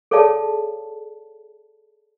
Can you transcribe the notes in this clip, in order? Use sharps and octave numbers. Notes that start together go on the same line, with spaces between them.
G#4 A4 C#5 D5 F5 A5